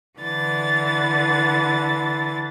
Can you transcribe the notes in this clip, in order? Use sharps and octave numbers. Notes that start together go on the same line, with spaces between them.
D3 E3 A6